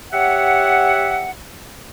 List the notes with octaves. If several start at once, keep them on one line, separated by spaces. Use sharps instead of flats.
G4 C#5 E5 F#5